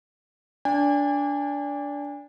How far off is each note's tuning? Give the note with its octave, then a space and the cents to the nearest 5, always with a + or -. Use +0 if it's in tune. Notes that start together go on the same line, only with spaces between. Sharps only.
D4 -20 G#5 -40